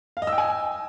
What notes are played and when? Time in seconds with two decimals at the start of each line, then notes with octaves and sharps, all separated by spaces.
0.17 F5
0.22 D#5
0.27 E6
0.33 G5
0.38 G#5